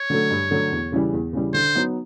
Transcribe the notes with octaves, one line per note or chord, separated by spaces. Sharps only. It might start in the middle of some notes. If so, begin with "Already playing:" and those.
Already playing: C#5
D3 F#3 A3
G2
D3 F#3 A3
E2
C#3 E3 G3
E2
C#3 E3 G3
D3 C5
F#3 B3 D#4